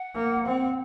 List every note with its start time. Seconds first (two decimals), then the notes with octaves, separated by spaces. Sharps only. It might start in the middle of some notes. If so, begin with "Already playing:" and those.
Already playing: F#5
0.14 A#3
0.46 C4